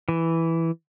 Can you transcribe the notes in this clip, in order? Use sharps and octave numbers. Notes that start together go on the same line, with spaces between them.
E3